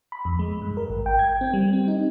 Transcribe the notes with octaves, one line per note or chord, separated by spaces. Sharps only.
B5
F2
G#3
G2
A#4
G#1
G5
G#6
C4
G3
C4
D#4